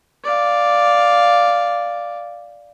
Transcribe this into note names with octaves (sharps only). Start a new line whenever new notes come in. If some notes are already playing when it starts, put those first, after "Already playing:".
D5 F5